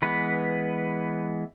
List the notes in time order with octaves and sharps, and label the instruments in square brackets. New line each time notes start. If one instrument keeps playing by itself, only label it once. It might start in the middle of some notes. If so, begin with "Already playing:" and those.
[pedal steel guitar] E3 G#3 B3 B4